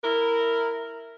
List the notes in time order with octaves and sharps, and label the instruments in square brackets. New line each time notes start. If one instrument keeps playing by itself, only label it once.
[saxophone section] E4 A#4